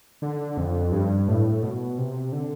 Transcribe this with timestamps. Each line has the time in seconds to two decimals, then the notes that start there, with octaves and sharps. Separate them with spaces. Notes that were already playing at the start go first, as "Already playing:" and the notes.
0.22 D3
0.58 F2
0.92 G2
1.28 A2
1.63 B2
1.98 C3
2.32 D3